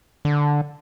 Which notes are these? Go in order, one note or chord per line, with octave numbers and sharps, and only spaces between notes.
D3